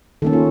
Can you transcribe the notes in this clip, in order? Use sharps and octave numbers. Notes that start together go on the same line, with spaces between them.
D#3 A#3 C#4 A4
F4